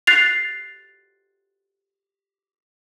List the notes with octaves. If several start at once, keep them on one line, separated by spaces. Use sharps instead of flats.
F#6 A6 C7 F7